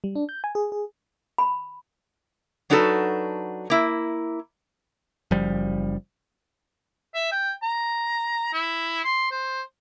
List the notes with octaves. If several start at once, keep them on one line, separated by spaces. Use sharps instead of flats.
G3
D4
G6
G#5
G#4
G#4
B5
F#3 D4 D#4 F#4 A4 B4
A#3 E4
F#1 F3 G3
E5
G5
A#5
E4
C6
C5